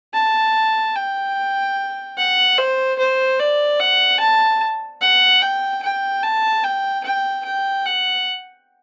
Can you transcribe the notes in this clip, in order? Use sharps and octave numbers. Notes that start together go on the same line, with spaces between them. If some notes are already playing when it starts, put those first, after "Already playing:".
A5
G5
F#5
C5
C5
D5
F#5
A5
F#5
G5
G5
A5
G5
G5
G5
F#5